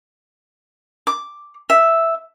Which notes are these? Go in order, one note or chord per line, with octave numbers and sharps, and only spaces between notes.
D6
E5